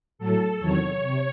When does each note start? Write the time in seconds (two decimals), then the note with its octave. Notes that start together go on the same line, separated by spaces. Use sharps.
0.19 A2 F#3 A4
0.59 E2 C3 D#3 F#3 C#5
1.00 C3